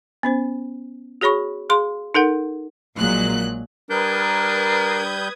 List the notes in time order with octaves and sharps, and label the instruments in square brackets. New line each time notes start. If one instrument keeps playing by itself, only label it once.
[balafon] B3 C#4 C5
F#4 G#4 C#5 B5 C#6
G#4 F5 C6
D#4 A4 A#4 F#5
[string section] A#1 A#2 F#3 G#3 F#6
[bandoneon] G3 G6 [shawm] D4 [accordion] A#4 [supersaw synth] B4 D#6 G#6